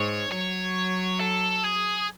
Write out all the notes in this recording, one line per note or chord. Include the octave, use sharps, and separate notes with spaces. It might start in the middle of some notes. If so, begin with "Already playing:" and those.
Already playing: G#2 C#5
F#3 C#5
A4
G#4